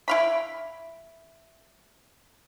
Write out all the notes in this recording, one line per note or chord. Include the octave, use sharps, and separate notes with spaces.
E4 F5 B5